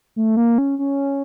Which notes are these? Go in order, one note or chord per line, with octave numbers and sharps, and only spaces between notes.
A3
A#3
C#4
C#4